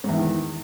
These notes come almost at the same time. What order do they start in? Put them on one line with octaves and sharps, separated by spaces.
G#2 E2 E3 D#3